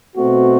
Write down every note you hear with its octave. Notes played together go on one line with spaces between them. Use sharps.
B2 A3 C4 F#4